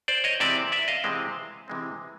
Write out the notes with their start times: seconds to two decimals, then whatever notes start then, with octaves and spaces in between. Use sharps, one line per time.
0.08 C5 D5
0.24 C#5 D#5
0.40 C3 E3 G#3 C4 D5 E5
0.72 D5 E5
0.88 D#5 F5
1.04 C3 E3 G#3 C4
1.68 C3 E3 G#3 C4